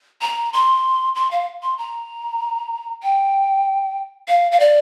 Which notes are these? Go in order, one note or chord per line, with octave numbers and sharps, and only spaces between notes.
A#5
C6
C6
F5
C6
A#5
G5
F5
F5
D5